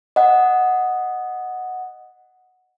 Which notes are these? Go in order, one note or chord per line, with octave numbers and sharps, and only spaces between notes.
D#5 F#5